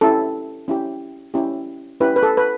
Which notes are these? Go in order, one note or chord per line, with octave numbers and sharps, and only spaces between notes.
C#4 E4 G4 A4
C#4 E4 G4
C#4 E4 G4
C#4 E4 G4 B4
B4
A4
B4